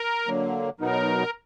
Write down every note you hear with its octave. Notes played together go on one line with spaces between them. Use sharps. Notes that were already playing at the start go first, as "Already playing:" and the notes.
Already playing: A#4
D3 F#3 A#3
B2 F#3 B3 D#4 A#4